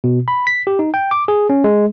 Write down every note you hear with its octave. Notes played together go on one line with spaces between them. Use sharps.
B2
B5
B6
G4
D#4
G5
D6
G#4
C#4
G#3